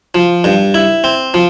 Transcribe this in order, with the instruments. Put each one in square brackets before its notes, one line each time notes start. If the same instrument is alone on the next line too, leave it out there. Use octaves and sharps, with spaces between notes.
[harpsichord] F3
G2
E4
C4
F3